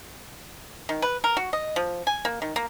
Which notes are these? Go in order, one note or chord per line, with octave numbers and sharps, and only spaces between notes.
D#3
B4
A#4
F#4
D#5
F3
G#5
A#3
D#3
A#3